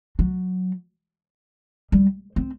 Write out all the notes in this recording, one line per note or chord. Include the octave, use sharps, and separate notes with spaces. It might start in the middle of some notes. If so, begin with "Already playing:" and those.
F#3
G3
C4